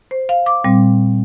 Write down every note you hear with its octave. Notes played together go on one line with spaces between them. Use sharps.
C5
F5
D6
A#2 G3 C4